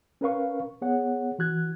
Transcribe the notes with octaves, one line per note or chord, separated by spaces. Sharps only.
C#4 A#4 B4 F5 C#6
B3 G#4 C#5 F#5
E3 F#4 F#6 G#6